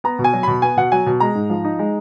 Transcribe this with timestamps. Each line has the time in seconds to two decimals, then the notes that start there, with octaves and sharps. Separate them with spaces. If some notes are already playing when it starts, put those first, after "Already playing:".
0.04 B3 A#5
0.19 B2
0.24 G#5
0.33 F#3
0.43 B2 B5
0.62 B3 G#5
0.77 B2 F#5
0.92 F#3 G#5
1.06 B2
1.20 G#3 A#5
1.35 G#2
1.50 F3
1.65 D#4
1.79 G#3